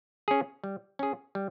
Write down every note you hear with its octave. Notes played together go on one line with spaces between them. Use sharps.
C#4 G#4
G3
C#4 G#4
G3